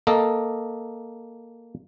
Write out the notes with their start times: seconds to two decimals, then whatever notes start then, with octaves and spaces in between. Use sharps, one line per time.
0.07 A#3 A4 D#5